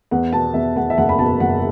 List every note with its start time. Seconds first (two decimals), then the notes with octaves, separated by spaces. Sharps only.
0.11 E2 F#5
0.33 B2 A5
0.54 E2 E5
0.76 E2 F#5
0.90 E5
0.98 F#1 F#5
1.09 B5
1.19 B2 A5
1.40 F#1 F#5